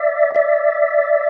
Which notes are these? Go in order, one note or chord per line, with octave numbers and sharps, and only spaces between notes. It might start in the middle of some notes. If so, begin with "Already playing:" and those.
Already playing: D5 E5
D5 E5